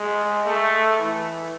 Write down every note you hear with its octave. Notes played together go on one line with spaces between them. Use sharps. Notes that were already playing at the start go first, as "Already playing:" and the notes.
Already playing: G#3
A3
E3